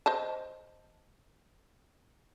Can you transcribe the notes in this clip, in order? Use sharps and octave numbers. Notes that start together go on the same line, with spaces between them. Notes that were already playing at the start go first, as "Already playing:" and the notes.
C5 D#5 A5